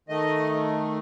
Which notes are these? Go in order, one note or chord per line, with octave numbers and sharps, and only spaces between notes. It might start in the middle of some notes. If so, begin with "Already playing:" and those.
D#3 A3 D#5